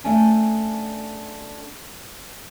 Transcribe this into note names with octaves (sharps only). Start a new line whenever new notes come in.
A3 C#4 D4 A4 G5 G#5